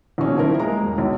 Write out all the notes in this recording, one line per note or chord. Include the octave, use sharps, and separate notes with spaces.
A#1 B2 C#4
D#3 F3 E4 A#4
G#3 A#3 A#5
E1
B1